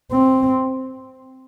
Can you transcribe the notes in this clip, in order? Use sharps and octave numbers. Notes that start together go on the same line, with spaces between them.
C4